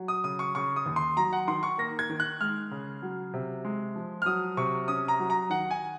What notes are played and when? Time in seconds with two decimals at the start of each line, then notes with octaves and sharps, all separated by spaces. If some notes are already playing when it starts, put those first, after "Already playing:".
Already playing: F#3
0.08 D#6
0.24 C#3 D#6
0.39 C#6
0.55 C#3 C#6
0.76 D#6
0.86 D#2
0.96 C6
1.17 F#3 A#5
1.33 F#5
1.48 D#3 C6
1.63 C#6
1.78 A#3 A#6
1.99 G#6
2.09 D#3
2.20 F#6
2.41 G#3 F6
2.71 C#3
3.02 F#3
3.34 C3
3.65 G#3
3.96 F3
4.22 F6
4.26 F#3 D#6
4.57 C3 C#6
4.88 C#4 D#6
5.08 A#5
5.19 F#3
5.30 A#5
5.50 D#3 F#5
5.71 G#5